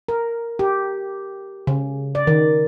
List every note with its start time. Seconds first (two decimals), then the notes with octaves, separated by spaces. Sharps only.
0.08 A#4
0.59 G4
1.67 C#3
2.15 D5
2.27 D#3